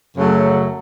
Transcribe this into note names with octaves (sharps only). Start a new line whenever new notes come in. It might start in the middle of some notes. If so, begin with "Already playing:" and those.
F#2 C#3 F#3 A3